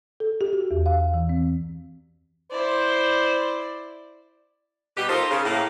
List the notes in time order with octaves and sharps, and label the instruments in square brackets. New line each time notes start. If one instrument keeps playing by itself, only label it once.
[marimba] A4
G4
F#4
E2
F5
E3
C4
[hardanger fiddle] E4 D5 [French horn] C5
[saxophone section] B2 G3 G4
D#4 F4 A4 A#4 C5 D#5
C#3
A2 A#3